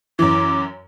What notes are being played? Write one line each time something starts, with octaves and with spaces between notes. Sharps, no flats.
F#2 E3 D6